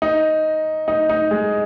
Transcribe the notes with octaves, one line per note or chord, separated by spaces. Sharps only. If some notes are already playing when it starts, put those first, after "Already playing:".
D#4
D#4
D#4
G#3